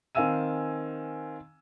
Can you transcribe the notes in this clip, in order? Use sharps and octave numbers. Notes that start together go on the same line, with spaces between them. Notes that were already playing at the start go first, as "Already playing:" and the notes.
D#3 C4 F5 G#5 E6 D#7